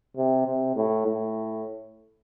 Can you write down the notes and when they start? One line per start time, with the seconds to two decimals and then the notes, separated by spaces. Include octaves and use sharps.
0.17 C3
0.46 C3
0.76 A2
1.06 A2